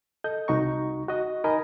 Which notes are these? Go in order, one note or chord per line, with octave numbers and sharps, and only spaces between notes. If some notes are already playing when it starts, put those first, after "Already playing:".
A4 D#5 G6
C2 D#4 F#4 A#5 C#6
F#4 D#5
D#4 A#4 D#5 G#5 A#5 B5